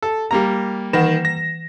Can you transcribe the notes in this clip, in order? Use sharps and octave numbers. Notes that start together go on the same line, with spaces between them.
A4
G3 A#3 A#5
D#3 E3 F#5 A#6 E7
A#6